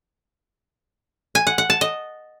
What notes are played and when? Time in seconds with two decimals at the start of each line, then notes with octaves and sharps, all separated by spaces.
1.35 G#5
1.47 F#5
1.58 F#5
1.70 A5
1.81 D#5